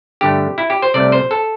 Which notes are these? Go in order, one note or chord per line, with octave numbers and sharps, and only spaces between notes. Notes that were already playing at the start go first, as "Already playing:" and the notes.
G2 D3 A3 G4
E4
G4
C5
C2 C3 A3 D5
C5
A4